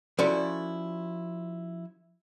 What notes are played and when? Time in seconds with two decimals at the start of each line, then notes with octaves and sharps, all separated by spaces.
0.18 F3 C#4 E4 F#4 A4 D5